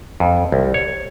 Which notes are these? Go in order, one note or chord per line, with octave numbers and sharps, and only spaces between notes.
F2
C2
C#5